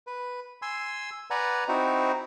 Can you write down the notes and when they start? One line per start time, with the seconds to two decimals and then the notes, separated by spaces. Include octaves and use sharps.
0.07 B4
0.62 G#5 C6 E6
1.30 B4 D5 F#5 G#5 A#5
1.68 C4 D#4 E4 F#4